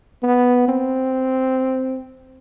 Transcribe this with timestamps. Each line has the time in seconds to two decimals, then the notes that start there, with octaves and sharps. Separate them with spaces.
0.23 B3
0.68 C4